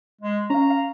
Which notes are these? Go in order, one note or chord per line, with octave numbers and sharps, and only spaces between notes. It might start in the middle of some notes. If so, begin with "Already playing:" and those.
G#3
C#4 F5 A#5
F5